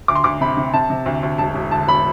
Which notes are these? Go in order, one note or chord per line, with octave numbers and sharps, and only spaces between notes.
D2 D6
C6
D2 D6
C3 B5
C3
C3 A5
C3
D2
D2
E1 A5
E1
D3 A5
E1 B5